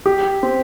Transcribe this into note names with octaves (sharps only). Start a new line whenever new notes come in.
G4
C4